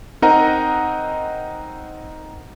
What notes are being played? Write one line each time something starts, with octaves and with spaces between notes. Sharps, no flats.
C4 D#4 A#4 D#5 F#5 A#5